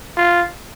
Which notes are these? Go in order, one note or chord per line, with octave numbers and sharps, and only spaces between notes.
F4